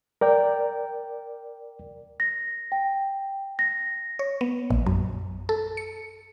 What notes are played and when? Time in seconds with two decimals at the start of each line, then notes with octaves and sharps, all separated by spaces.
0.21 A#4 D5 G5
2.20 A#6
2.72 G5
3.59 A#6
4.19 C#5
4.41 B3
4.70 A#1
4.86 F#2
5.49 A4
5.77 C#7